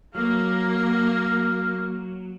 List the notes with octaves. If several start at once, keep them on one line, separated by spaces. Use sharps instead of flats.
F#3 A#3 F5